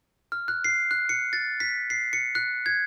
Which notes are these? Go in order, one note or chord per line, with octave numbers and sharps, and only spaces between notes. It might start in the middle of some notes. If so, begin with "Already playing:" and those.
F6
F#6
C7
F#6
C#7
A6
B6
C7
C#7
F#6
G#6